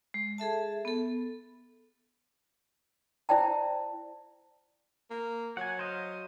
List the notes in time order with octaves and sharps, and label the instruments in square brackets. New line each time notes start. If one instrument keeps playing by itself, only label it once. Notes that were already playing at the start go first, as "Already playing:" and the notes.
[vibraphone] G#3
G#4 A4 E5 A5
B3 A4
[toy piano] E4 C5 D5 G5 A5
[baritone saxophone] A#3
[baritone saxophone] F#3 [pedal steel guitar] F#5 G#5
[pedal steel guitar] C5 D#5 F5